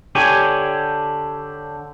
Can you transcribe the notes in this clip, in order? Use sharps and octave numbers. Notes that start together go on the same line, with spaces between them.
D3 G4 C#5 G#5